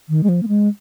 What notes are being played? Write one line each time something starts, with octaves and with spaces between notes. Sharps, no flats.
D#3
G#3
F3
A#3
G#3